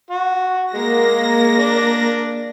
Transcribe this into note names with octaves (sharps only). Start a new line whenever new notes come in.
F#4
G#3 A#3 A#6
D4